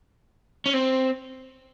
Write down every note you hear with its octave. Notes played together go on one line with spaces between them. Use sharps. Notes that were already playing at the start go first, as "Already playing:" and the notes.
C#4
C4